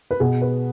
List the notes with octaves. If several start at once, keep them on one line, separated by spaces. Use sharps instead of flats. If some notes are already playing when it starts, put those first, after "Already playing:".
B4
B2 G#4
B4